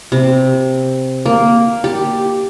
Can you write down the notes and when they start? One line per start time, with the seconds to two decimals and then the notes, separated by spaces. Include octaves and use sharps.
0.12 C3
1.26 A#3
1.84 G4